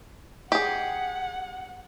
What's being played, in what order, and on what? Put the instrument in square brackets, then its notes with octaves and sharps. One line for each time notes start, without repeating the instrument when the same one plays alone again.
[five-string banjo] G4 G#4 [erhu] F#5